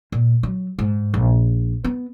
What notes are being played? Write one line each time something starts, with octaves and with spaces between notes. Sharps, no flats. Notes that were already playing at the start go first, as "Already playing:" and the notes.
A#2
F#3
G#2
A#1
B3